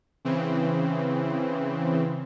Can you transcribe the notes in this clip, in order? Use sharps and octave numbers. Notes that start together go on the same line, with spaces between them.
C#3 E3 C4